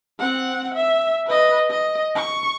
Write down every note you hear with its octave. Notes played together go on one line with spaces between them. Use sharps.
C4 F#5
E5
B4 D#5
D#5
C#6